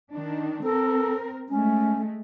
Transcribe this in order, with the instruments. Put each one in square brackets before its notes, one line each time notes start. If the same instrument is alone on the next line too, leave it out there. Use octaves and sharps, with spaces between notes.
[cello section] D#3 D4
[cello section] C4 A#4 [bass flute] A4
[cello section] G#3 A3 [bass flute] C#4